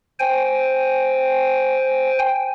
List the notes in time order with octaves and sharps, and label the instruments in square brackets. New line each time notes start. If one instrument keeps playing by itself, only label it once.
[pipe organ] C5 G5 G#5